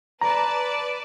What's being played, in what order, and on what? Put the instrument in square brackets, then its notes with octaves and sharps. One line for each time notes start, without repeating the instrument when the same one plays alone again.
[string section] B4 D5 A5 [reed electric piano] A#5